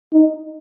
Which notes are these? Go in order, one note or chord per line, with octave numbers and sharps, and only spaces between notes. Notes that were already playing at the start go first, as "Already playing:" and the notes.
D#4